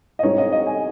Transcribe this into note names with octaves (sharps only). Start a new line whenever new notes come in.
D#5
G#2 G3 C4 D#4 C#5
D#5
D#5
G#5